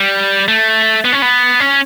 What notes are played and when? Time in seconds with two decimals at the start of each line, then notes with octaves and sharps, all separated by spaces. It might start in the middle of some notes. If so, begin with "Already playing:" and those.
Already playing: G3
0.48 A3
1.05 B3
1.12 C#4
1.22 B3
1.60 C#4